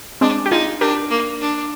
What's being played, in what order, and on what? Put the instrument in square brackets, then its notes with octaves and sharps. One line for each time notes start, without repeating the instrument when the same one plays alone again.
[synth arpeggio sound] G#3 C4 [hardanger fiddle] D4
[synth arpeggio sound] G4
[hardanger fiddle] D#4 [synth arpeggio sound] F4 G#4
[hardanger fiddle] D4 [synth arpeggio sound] G4 A#4
[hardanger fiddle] A#3
D4